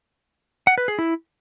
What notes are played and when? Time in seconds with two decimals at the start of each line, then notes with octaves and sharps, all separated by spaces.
0.67 F#5
0.78 B4
0.88 G#4
0.99 E4